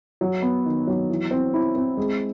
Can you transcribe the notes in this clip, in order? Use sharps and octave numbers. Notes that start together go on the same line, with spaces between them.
F#3
B3
D#3
F#3
E3
C4
E4
C4
G#3